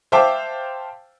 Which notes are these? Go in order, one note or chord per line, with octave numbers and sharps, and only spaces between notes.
C5 E5 F5 G5 A5 D6